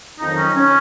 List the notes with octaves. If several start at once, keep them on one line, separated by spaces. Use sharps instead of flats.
F2 D#3 F#3 D#4
C#4
C#4